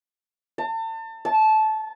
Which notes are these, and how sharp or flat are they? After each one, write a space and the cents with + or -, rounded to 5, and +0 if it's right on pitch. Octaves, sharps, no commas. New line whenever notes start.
A5 +35
A5 -20